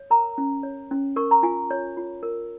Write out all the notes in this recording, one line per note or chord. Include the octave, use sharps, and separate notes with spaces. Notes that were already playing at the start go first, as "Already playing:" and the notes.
Already playing: C#5
A#4 A#5
C#4
C#5
C#4
A#4 C#6
A#5
F4 G#5
C#5
F4
A#4